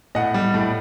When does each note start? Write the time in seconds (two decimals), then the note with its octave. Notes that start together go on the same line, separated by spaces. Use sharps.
0.15 A2 D#5 F#5
0.34 G3
0.54 A2